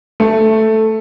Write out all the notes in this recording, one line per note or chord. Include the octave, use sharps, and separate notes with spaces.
A3